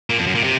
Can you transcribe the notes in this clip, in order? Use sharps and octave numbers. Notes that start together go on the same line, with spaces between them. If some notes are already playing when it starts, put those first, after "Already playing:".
A#2
F2
F#2
A#2
C3